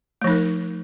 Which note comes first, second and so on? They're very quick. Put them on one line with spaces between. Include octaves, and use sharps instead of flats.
A3 F3 D#4 A#4